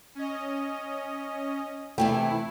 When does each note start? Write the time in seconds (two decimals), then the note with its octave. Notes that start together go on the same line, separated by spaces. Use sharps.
0.15 C#4 D#5
1.98 C3 E3 A3 E4 G5